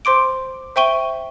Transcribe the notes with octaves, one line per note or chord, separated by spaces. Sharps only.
C5 C6 D6 D7
C5 E5 G5 C#6 D#7 G7